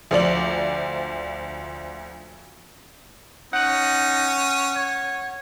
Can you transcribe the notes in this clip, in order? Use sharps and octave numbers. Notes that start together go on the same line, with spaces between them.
D2 F3 D5 F#7
C#4 D#4 F#5 F#6
C#5